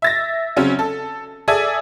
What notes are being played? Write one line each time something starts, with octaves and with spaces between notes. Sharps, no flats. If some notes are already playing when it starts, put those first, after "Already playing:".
E5 A6 A#6
C#3 F#3 C4 C#4
A4
G#4 A4 D5 E5 G#5